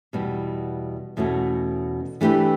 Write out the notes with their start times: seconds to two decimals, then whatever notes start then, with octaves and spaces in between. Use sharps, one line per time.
0.13 E2 B2 G3 B3
1.17 E2 B2 A3 C#4 F#4
2.21 E3 A3 D4 G4 B4